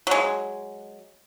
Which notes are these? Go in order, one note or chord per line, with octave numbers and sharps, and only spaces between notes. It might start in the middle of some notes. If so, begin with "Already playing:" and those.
F#3 G#3